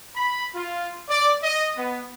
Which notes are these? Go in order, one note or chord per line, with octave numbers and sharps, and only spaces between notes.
B5
F4
D5
D#5
B3